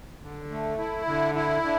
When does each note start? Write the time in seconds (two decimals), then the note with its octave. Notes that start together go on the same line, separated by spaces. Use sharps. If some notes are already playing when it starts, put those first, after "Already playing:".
0.22 D3
0.50 A3
0.78 E4
1.06 D3
1.35 E4
1.63 D3